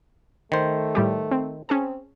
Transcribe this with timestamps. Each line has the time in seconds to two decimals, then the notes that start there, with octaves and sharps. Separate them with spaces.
0.52 D#3 A3 C5
0.95 A2 G3 G4
1.31 C4
1.69 C4 C#4 G#4 A5